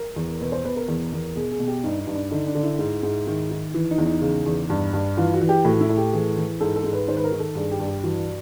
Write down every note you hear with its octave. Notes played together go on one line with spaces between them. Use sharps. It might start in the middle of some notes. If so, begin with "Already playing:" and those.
Already playing: A#4
E2
B2 B4
C5
B2 B4
A#4
E2
E2
B2 G#4
G#4
B2
G4
G2 D#4
D#4
G2
D4
D3 D#4
D4
D3
E4
G#2
G#2
D#3
D#3
E3
D#4
E2
D#4
C#3
E2
G2
G2
E3 F4
F#4
E3
G4
A2 F#4
E4
A2
G4
E3 G#4
E3
G#2 A4
A4
G#2
B4
D#3 C5
B4
A#4
D#3
A4
G2 G#4
G4
G2
G4
E3 F#4